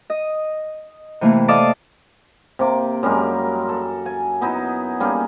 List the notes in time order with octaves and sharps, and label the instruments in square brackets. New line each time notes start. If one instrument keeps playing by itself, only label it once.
[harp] D#5
C3 E3 A3 A#3
A4 D5 D#5 F5 A5 D6
[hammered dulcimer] C3 A#3 D6
F#2 G3 G#3 A#4
A4
G#5
B3 D#4 E4 D#5
G3 A#3 C#4 G#4